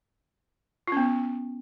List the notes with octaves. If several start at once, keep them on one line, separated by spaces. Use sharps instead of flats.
B3 C#4 F4